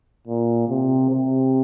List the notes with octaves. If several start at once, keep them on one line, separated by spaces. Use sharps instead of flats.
A#2
C3
C3